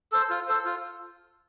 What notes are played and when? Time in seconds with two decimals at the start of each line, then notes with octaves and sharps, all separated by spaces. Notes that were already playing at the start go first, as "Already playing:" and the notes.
0.12 A4 C5
0.30 F4
0.48 A4 C5
0.65 F4